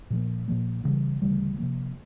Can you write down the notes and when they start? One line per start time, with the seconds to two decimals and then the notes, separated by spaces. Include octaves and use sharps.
0.10 A#2 F3 A#3
0.48 A#2 F3 A#3
0.84 D2 C#3 E3 G3
1.22 D2 C#3 E3 G3
1.58 C3 F3 A#3